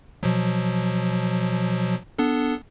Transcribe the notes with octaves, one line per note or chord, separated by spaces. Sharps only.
B2 F3 F#3
B3 D4 A4